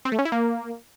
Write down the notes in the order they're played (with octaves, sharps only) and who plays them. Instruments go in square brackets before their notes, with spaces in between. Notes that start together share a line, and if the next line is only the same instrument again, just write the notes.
[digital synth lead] C4
A3
C#4
E4
A#3